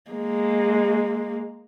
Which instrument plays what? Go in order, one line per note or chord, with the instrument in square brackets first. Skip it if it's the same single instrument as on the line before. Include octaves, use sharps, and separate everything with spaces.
[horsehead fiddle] G#3 A#3